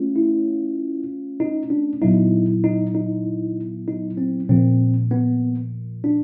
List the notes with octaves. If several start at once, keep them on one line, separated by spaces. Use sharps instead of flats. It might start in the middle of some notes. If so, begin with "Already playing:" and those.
Already playing: A3 C#4 F4
E4
D#4
D4
A#2 F#3 B3 D#4 E4
D#4
D#4
D#4
C4
A#2 F3 A#3 C4
B3
D4